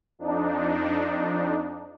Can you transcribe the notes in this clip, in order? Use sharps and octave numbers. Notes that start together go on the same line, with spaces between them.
F2 D4 D#4